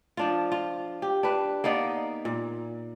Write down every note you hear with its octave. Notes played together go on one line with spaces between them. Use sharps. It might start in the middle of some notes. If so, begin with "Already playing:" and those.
F3 D4 F4
F4
G4
D4 B4
A#3 B3 D#4 D5
A#2